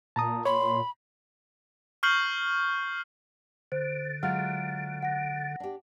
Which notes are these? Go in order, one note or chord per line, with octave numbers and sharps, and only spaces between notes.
A#2 A5 A#5 D#6
C#5 B5 C6
C#6 F6 G6 C7 F#7
D3 C5
F#3 G#3 F4 F#5 F6
F#5 A#6
D4 G4